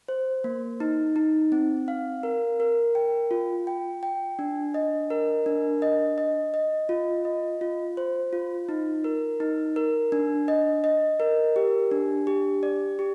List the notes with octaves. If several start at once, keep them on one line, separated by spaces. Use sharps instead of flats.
C5
A#3
D#4
D#4
C4
F5
A#4
A#4
G5
F4
G5
G5
D4
D#5
A#4
D4
D#5
D#5
D#5
F4
D#5
F4
C5
F4
D#4
A#4
D#4
A#4
D4
D#5
D#5
A#4
G4
D4
G4
D5
G4